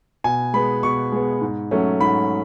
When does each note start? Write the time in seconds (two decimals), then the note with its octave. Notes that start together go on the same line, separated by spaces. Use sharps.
0.24 B2 G#5
0.54 G#3 B3 B5
0.83 B2 C#6
1.12 G#3 B3
1.41 G#2
1.71 F#3 A3 C#4
2.01 G#2 B5